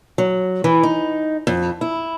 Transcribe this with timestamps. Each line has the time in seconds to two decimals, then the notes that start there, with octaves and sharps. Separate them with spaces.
0.18 F#3
0.64 E3
0.83 D#4
1.47 F2
1.81 E4